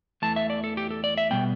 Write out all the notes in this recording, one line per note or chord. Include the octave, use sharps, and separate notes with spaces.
E2 E3 A3 A5
E5
D5
A4
G4
A4
D5
E5
B2 G3 B3 G5